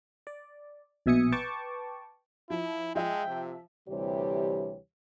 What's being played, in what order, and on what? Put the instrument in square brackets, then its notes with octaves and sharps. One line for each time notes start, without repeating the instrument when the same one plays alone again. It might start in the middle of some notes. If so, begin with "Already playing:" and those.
[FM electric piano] D5
A#1 B2 E5 G#5 D#6 C#7
B4 G5 A5 C#6 D6
[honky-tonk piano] F3 [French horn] E4
[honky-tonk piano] F3 E5 [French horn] G#3 [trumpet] G5
[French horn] C3
[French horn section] D2 C3 E3 G3 G4 C#5